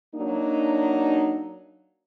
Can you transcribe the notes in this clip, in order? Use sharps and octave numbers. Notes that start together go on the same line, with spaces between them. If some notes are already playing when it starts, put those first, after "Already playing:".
F#3 A#3 D4 D#4